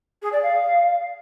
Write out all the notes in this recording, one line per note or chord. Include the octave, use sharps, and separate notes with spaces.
G#4
D5
F5